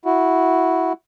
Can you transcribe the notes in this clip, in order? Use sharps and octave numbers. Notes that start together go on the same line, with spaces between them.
E4 F#4